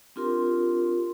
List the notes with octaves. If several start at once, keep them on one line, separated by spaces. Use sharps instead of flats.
C4 D4 F4 G4 A#4 C6